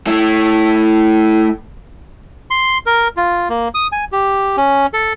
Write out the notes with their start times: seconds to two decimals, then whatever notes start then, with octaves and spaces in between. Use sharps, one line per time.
0.07 A3 E4
2.51 C6
2.86 A#4
3.17 F4
3.50 A#3
3.74 D#6
3.92 G#5
4.12 G4
4.57 C#4
4.93 A4